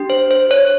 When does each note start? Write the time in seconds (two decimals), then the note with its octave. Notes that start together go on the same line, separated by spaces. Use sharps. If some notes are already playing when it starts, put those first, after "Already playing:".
Already playing: D4 G4
0.10 C5
0.31 C5
0.51 C#5